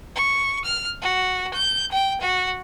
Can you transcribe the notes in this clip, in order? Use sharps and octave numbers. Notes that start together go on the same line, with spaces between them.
C#6
F6
F#4
G6
G5
F#4